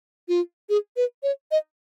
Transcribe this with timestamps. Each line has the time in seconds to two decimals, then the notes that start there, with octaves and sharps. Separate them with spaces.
0.28 F4
0.69 G#4
0.97 B4
1.23 C#5
1.51 D#5